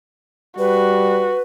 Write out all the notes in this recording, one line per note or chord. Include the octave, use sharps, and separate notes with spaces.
G3 F#4 B4